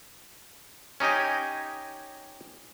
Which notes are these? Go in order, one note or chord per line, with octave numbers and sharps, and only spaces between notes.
C#4 D#4 G4 D#5 G#5